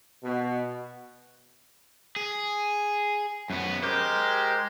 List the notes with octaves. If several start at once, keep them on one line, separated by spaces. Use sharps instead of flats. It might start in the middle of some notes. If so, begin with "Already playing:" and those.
B2
G#4
F#2 B3
G#3 G4 A#4 C5